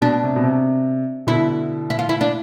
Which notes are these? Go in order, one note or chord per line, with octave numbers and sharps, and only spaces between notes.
B2 D4
C3
B2
C3
B2 D3 E4
E4
F4
E4
D4